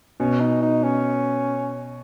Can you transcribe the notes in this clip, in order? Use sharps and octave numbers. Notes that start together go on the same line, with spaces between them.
B2 C#4
D#4
D#4
C#4